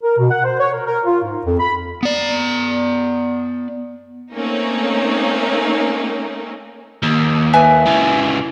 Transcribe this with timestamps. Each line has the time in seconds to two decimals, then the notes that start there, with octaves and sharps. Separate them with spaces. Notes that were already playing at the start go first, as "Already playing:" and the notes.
0.03 A#4
0.18 B2
0.31 F#5
0.44 C5
0.59 C#5
0.73 A#4
0.85 A#4
1.05 F4
1.23 G#2
1.45 F2
1.59 B5
2.03 B3 D5
4.33 A3 A#3 C4 C#4 D#4
7.02 D#2
7.53 B4 E5 G#5
7.87 C#2 E3